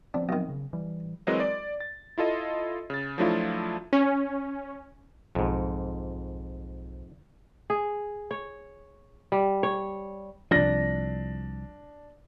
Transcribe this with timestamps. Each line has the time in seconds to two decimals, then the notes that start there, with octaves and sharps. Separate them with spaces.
0.14 F3 B3 C4 D4
0.29 B1 D#3
0.49 C#3
0.73 E3 G3
1.27 E3 F#3 G#3 C4 A#4 D#5
1.40 D5
1.80 A6
2.18 E4 F4 A4 D#5
2.90 C#3 A6
3.18 F3 F#3 A3 D4 E4 F4
3.93 C#4
5.35 B1 F2 G#2
7.70 G#4
8.31 C#5
9.32 G3
9.63 C#5
10.51 C2 F3 D4 A#6